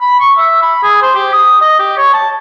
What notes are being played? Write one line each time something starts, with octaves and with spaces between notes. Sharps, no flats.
B5
C#6
E5
B5
G#4
C5
G4
D#6
D#5
G4
C#5
A5